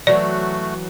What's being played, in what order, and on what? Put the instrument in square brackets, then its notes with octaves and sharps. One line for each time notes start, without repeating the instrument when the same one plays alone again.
[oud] E3 F#3 [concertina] A3 F#4 [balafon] D5